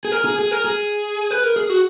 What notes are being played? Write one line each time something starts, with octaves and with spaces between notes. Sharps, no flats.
G#4
A#4
G#4
G#4
A#4
G#4
B4
A#4
G#4
F#4